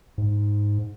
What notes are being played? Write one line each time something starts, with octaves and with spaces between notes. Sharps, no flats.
G#2